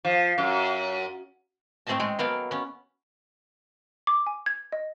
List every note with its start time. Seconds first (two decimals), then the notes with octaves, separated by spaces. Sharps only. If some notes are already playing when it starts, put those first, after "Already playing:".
0.05 F3
0.38 F#2
1.87 A2 A3 C4 G#4 D#5 A5
2.00 G#3 C4
2.19 F#3 A#3 B3 A4 F5 G5
2.51 B3 C#4
4.07 D6
4.27 G#5
4.46 G#6
4.72 D#5